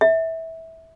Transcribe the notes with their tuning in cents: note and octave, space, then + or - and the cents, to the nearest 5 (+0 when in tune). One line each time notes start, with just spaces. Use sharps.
E5 -20